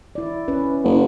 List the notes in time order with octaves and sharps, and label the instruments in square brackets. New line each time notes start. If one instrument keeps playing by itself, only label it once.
[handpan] E4 D5
C#4 B4
[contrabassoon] F#1